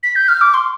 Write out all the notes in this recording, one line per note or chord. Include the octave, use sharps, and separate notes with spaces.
B6
G6
F6
D6
C6